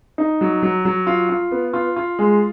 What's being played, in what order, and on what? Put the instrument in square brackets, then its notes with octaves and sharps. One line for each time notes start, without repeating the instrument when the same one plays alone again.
[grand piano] D#4
F#3
F#3
F#3
F4
F4
B3
F4
F4
G#3